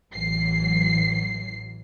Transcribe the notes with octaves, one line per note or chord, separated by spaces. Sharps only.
A1 E3 F#3 C7